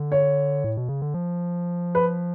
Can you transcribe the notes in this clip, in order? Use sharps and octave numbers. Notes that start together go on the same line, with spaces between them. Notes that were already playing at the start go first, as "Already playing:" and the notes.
Already playing: D3
C#5
A2
B2
C#3
D3
F3
B4